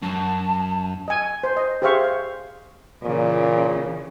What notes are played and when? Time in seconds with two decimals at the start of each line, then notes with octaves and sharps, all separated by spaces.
0.03 F#2 A5
1.08 D#5 G#5
1.43 C5
1.57 D#5
1.82 G4 G#4 C5 E5 F5 C#6
2.04 F5
3.03 A#2 C#3 E3